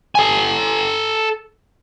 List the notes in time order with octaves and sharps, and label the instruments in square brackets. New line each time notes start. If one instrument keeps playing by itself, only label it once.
[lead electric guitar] A4 G#5